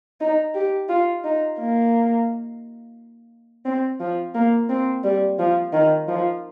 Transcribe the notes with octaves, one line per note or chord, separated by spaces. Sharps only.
D#4
G4
F4
D#4
A#3
C4
F3
A#3
C4
G3
F3
D#3
F3